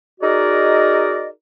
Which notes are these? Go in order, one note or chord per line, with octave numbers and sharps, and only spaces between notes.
D#4 F#4 G#4 A#4 D5 D#5